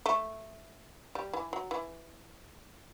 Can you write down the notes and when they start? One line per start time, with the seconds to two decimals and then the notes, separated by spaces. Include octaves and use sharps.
0.06 A3
1.15 G3
1.33 E3
1.53 F#3
1.71 E3